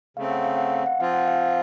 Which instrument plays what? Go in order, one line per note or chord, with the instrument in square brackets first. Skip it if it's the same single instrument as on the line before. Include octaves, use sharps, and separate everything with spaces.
[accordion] C#3 A3 C4 [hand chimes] F5
[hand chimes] F#5
F5
F#5
F5
F#5
[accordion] F3 C4 F4 [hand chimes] F5
[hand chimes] F#5
F5
F#5